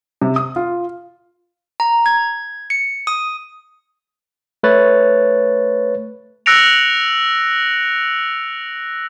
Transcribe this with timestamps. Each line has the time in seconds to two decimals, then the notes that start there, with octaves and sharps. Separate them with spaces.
0.22 C3
0.36 D#6
0.56 F4
1.80 A#5
2.06 G#6
2.70 C#7
3.07 D#6
4.63 A3 B4 C#5 A6
6.46 E6 F#6 A#6 C#7 D7 F7